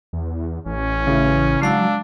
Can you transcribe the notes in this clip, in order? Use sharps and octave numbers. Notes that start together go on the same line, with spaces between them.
E2
A1 C#4
C#3 E3
F#3 G#3 D4 F5 E6